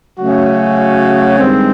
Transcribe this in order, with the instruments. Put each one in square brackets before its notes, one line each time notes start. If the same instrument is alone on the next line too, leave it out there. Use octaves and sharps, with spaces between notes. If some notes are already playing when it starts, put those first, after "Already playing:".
[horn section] C#3 F#3 A3 C#4 F#4
G2 D#3 G#3 C4